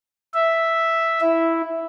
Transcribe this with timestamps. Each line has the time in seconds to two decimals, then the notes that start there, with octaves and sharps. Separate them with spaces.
0.34 E5
1.21 E4